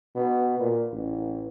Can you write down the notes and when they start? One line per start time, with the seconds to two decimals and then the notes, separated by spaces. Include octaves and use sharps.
0.15 B2
0.60 A#2
0.92 A1